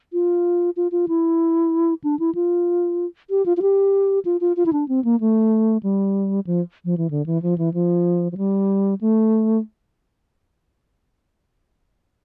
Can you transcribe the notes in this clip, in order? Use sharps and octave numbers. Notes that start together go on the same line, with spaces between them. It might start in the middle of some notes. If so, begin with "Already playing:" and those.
F4
F4
F4
E4
D4
E4
F4
G4
F4
F4
G4
F4
F4
F4
E4
D4
C4
A#3
A3
G3
F3
F3
E3
D3
E3
F3
E3
F3
F3
G3
A3